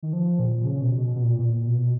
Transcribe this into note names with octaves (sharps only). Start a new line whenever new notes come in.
D#3
F3
A#2
C#3
B2
B2
B2
A#2
A#2
B2